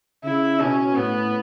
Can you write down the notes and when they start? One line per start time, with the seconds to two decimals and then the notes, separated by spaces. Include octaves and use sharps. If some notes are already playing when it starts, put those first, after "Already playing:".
0.24 C#3 E4
0.60 B2 C#4
0.96 A2 B3